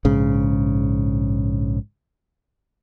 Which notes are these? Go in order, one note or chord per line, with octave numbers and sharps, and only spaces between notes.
A#1 G#2 C#3